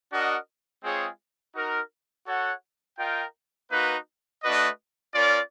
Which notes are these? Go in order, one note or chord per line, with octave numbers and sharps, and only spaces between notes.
D4 F#4 A#4 D#5 F#5
G#3 C4 F4 G#4 C#5
D#4 F#4 A#4
F#4 A4 C#5 F#5
F4 A#4 D#5 G5
A#3 D#4 F#4 B4
A3 D4 F#4 B4 D#5
C#4 F4 A#4 D5